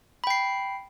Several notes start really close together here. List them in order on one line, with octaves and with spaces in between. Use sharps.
B5 G5 C7